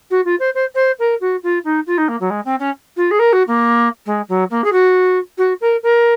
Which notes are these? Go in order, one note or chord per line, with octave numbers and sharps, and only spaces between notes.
F#4
F4
C5
C5
C5
A#4
F#4
F4
D#4
F4
D#4
A#3
F#3
G#3
C4
C#4
F4
G#4
A#4
F#4
A#3
G#3
F#3
A#3
G#4
F#4
F#4
A#4
A#4